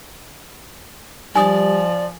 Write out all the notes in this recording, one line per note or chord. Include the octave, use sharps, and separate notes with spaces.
F3 G3 D5 G#5 D#6